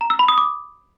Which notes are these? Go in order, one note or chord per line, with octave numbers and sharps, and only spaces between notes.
A#5
E6
B5
D#6
D6